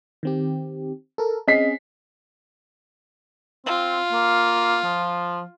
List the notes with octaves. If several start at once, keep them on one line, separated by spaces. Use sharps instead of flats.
D#3 C4 G4
A4 A#4
C4 C#4 G#4 D#5 B6 C7
C4 F4
A#3
F3